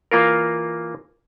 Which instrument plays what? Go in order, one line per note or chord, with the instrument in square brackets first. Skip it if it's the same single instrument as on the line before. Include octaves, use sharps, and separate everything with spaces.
[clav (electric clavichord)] E3 A#3 F4 A#4